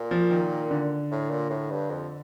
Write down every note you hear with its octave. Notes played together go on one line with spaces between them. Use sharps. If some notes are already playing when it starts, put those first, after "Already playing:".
Already playing: A#2
F3
D#3
D3
A2
A#2
A2
G2
F2